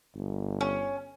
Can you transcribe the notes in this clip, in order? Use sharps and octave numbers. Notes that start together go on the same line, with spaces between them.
G1
C#4